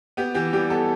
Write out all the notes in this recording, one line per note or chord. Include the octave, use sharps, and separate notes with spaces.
B3 G4
E3 G4
G3 G4
B3 A4